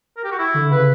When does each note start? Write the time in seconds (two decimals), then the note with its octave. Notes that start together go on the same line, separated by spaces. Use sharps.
0.17 A#4
0.24 G4
0.32 F#4
0.39 E4
0.54 D3
0.71 C#3 B4